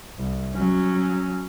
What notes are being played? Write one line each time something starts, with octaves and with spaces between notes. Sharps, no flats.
C2
F#3 C#4